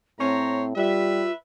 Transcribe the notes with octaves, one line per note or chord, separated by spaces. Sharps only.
A2 C4 C5 C#5 A#5
G3 F4 B4 E5